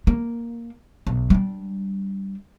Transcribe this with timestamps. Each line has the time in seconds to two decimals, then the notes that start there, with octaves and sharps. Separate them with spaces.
0.07 A#3
1.07 B1
1.30 G3 D4